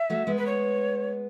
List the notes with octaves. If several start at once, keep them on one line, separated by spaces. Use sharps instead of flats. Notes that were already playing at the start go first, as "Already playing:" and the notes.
Already playing: E5
F#3 A3
G#3 B3
B4
C#5